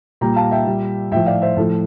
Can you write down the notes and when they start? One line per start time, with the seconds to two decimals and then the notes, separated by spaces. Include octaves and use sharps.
0.21 A#2 G3 G5 A#5
0.36 F5 A5
0.51 E5 G5
0.66 A#2 G3
1.12 A2 F3 E5 G5
1.26 D5 F5
1.42 C5 E5
1.57 A2 F3 A4